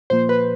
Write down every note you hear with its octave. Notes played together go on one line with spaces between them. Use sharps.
A#2 F3 A#3 C5
B4